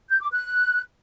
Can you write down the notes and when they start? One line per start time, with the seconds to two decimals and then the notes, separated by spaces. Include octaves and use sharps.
0.09 G6
0.21 D6
0.32 F#6